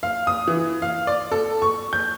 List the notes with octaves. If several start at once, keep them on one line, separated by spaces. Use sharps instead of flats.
F5
D#6
E3
F5
D5
A4
C#6
G6